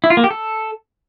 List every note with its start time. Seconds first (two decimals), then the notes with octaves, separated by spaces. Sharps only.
0.04 E4
0.10 F4
0.17 A#3
0.24 G4
0.31 A4